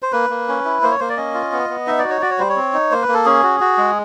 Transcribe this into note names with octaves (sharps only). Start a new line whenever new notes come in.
C5
A#3 B4
A#3
C#4
E4
A#3 C5
C#5
A#3 C5
D5
C#4 D#5
F4
B3
B3
D#4 E5
F#4 D5
C#5
F#4 D5
C#5
G3 C5
C#5
C4
D#4
A#3 C5
B4
A#3
A4
C#4 G#4
F#4
F#4
G#3